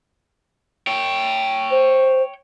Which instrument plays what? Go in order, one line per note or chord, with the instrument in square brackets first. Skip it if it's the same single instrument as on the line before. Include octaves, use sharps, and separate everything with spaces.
[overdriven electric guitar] C#5 G5
[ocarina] C5